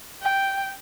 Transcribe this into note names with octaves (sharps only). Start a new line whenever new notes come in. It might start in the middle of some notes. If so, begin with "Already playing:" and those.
G5